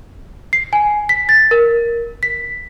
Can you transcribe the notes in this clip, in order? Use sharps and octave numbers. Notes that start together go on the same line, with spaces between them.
C7
G#5
B6
A6
A#4
B6